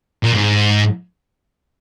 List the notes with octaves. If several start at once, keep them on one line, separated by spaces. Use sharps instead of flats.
A#2
G#2